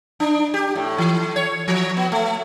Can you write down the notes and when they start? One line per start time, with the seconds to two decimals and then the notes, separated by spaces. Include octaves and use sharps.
0.20 D4
0.54 G4
0.76 A2
0.98 E3
1.36 C#5
1.68 F3
1.97 B3
2.12 A3